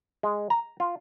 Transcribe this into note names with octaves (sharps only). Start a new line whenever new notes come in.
G#3
A#5
F4